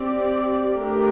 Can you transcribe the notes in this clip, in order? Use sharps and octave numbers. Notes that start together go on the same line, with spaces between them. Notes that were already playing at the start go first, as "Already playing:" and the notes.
Already playing: C4 G4 D5
A3 D4 G4 A#4